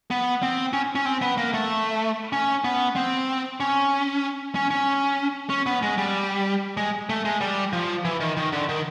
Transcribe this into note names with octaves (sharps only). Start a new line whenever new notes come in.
B3
C4
C#4
C#4
C4
B3
A#3
A3
C#4
B3
C4
C#4
C#4
C#4
C#4
B3
G#3
G3
G#3
A3
G#3
G3
F3
E3
D#3
D#3
D3
D#3